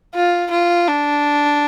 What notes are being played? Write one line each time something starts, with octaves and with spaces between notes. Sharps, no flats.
F4
F4
D4